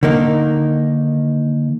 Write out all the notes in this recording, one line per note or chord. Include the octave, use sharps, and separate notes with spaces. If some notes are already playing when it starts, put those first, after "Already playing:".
D3 D#3 A#3 D#4